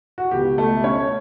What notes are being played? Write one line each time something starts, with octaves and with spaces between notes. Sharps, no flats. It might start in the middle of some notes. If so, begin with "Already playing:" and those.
F#4
C#2 B2 G4
A3 A4
C#4 C#5